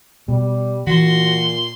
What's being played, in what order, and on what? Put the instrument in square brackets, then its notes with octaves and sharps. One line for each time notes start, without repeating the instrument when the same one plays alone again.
[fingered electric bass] B2 [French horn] G3
[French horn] A#2 [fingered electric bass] E3 [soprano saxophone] F#4 [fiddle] C6